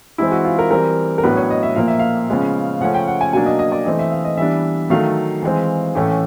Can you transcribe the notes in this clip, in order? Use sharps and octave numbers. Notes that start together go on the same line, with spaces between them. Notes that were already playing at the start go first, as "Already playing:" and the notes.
E3 G#3 C4 E4
F#4
F4
A#4
E3 G3 C4 A#4
A#4
A2 F#3 B3 D4 B4
C#5
D#5
E5
A#2 F3 A#3 F5
E5
F5
C#3 F3 G#3 B3
C#3 F3 A3 C#4 F#5
G5
F#5
G#5
B2 F#3 A#3 D4 G#5
D#5
D#5
D5
E3 A3 C4 D#5
E5
F5
D#5
E3 G3 B3 D4 E5
D#3 F#3 A3 F5
E3 G#3 C4
A2 E3 A3 C#4